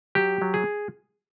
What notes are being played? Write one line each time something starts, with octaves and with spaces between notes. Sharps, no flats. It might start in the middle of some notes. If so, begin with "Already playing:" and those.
F#3 G4
F#3
G#4